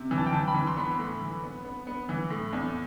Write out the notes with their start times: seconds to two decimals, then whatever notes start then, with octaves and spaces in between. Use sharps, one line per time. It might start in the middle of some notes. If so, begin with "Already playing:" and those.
Already playing: C3
0.11 E3
0.18 A5
0.26 G5
0.33 E3 A5
0.48 B5
0.54 E3
0.67 C6
0.77 B3 B5
0.99 A2
1.21 E3
1.43 B3
1.65 B3
1.87 B3
2.09 E3
2.30 A2
2.53 E2